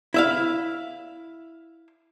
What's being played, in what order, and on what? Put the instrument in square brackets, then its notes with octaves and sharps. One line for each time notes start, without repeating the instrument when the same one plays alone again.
[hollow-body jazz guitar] E4 E5 F5